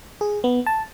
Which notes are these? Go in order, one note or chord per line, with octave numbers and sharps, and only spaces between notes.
G#4
B3
A5